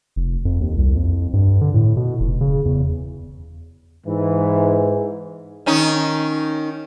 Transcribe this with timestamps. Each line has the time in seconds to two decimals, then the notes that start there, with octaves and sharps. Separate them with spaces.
0.16 F1
0.45 F2
0.61 D#2
0.77 C2
0.95 F2
1.33 G2
1.61 D3
1.74 A2
1.97 B2
2.20 F1
2.41 C#3
2.65 E2
4.07 G#2 E3
5.66 D#3 C#4 D#4